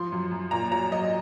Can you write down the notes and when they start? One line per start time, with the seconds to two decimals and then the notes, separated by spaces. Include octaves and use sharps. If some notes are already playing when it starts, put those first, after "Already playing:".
Already playing: F3 C6
0.12 F#2
0.31 F#2
0.51 A#2 A#5
0.71 F#3 A#5
0.92 F#3 D#5